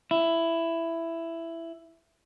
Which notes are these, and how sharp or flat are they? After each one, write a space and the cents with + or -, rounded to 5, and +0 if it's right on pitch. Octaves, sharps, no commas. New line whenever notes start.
E4 +10